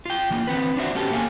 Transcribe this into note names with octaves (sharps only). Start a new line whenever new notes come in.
F4 G5
E3 A#3 F4
D3 C4 B4
D4 F4 F#4 C5 E5
B3 C#4 G4 A4
A3 A#3 A4 E5 F5 G#5